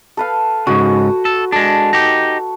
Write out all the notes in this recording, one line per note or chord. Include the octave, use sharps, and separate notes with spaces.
A4 B4 F5
G#2 C#3 F#4
A4
G#3 D4 A4
D#4 G4